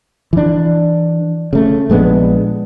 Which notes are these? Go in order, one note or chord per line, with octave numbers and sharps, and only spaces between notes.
E3 D4
C#3 A3
A#1 G#3 B3 D4